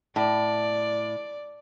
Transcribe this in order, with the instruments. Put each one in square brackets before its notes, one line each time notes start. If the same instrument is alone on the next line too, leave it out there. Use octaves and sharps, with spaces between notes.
[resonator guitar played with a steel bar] A2 [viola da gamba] D5